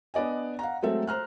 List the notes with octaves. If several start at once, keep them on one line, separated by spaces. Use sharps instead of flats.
B3 D4 D5 D#5 G#5
F5 F#5 A#5
F#3 G#3 A3 C4 A4 E5
C5 A#5 F6 F#6